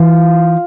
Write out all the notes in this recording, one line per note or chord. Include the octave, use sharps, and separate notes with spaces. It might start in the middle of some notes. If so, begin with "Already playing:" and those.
Already playing: E3 F4